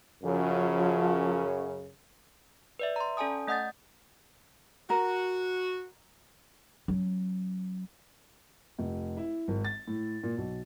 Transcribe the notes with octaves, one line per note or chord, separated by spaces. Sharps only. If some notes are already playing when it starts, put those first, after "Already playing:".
F#2 C#3 F3
B4 D5 E5
A#5 C6
C#4 A4 D5 G#5 A5 D#6
A3 D#5 F#5 D#6 G6 A6
F#4 A#4
F#3 C#4
F1
E4
G#1
A6
A2
A#2
B1